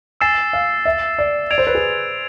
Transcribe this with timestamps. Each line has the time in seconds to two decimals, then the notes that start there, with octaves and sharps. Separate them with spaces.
0.21 G#5 E6 A6 C7 E7
0.53 F5
0.85 E5
1.18 D5
1.51 D5 G#6 D7 F7
1.58 C5
1.67 B4
1.75 G#4